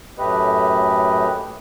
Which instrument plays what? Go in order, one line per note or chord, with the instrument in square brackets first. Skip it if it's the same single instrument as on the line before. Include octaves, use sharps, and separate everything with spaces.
[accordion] F#2 A2 A3 G4 B4 D#5